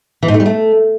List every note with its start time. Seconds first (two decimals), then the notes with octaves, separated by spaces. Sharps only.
0.23 E3
0.28 G#2
0.34 A3
0.40 G3
0.46 A3